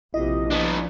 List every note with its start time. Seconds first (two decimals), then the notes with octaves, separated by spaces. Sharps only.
0.14 A#1 C3 E4 F4 D#5
0.50 F3 B3 D4